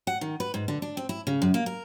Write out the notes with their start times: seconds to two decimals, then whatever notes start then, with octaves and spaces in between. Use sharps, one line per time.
0.07 F#5
0.21 D#3
0.40 B4
0.54 G#2
0.68 D3
0.82 D4
0.97 C4
1.09 E4
1.27 C#3
1.42 F#2
1.54 A#3
1.66 A#4